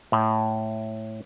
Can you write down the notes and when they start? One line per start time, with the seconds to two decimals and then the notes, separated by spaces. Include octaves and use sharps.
0.12 A2